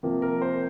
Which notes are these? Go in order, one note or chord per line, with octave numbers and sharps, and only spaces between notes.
C3 F3 A#3
A#4
C5